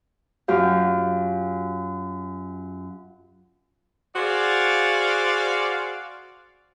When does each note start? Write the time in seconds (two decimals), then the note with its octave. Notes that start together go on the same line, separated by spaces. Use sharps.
0.48 F#2 F4 G4 F5
4.15 F#4 G#4 C5 D5 F5